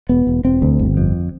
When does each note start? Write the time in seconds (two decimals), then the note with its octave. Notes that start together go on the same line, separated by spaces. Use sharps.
0.09 E1 B3
0.27 E1
0.44 E1 C4
0.62 D2
0.79 G1
0.97 F2